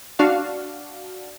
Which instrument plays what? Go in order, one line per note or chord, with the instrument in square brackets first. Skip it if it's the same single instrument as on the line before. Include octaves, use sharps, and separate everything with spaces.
[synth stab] D4 F#4 F5